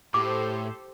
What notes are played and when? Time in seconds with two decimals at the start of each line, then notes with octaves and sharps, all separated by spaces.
0.14 A2 G4 A4 C5 D6